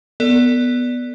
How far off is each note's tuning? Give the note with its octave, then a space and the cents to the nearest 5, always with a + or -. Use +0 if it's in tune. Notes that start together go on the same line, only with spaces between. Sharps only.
B3 +0 A4 +35 D5 +0